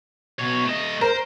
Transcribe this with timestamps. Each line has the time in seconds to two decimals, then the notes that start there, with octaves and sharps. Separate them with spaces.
0.39 B2 C#5
0.65 A3 D#5
1.01 A#4 C5